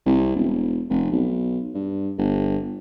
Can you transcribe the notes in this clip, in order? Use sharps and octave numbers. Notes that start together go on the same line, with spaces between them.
C2
E1
F1
B1
G2
G1